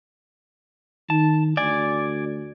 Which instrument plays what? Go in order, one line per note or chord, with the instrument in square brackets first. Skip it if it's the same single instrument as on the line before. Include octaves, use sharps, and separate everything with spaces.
[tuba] D#3 [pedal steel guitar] A5
[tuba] D2 [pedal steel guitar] D5 G#5